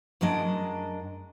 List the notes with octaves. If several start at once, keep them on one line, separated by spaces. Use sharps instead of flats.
F#2 F#3 G#3 D4 D#5